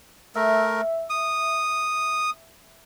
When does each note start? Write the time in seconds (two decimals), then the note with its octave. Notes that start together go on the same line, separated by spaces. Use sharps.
0.36 A3 A#4 E5
1.10 D#6